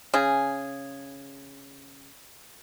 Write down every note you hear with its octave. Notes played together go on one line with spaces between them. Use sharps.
C#3 G#4